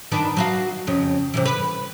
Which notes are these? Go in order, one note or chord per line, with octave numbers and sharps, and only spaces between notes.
D#3 D4 B4
F#3 F#4 F5
F2 C#3
C3 D#3 E3
B4